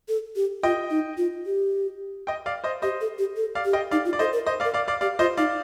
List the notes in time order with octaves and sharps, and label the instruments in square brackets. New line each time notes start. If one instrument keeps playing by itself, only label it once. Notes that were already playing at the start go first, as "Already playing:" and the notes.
[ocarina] A4
G4
[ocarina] F4 [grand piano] D#5 G5
[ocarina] D#4
F4
G4
[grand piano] D#5 G5
D5 F5
C5 D#5
[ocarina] G4 [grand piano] C5 D#5
[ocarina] A4
G4
A4
[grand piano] D5 F5
[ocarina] G4
[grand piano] D#5 G5
[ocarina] D#4 [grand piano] D5 F5
[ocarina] F4
[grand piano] D5
[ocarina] A4 [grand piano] C5 D#5
[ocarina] A#4
[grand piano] C5 D#5
D5 F5
[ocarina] A#4
[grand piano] D5 F5
D5 F5
[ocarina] G4 [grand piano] D5 F5
[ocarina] F4 [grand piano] C5 D#5
[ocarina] D#4 [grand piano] D5 F5